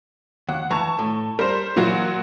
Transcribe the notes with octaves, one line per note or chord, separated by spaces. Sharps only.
D#2 F#5
E3 A5 A#5 C#6
A2
G3 A#4 C5
A#2 E3 F#3 F4 F#4